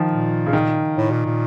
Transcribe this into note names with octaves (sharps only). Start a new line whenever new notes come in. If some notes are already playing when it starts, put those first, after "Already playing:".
Already playing: D#3 F3
A#2
C#3
D#3
A2
A#2
A#2